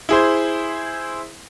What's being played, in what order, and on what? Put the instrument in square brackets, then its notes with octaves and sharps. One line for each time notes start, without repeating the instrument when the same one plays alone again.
[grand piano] E4 G#4 C5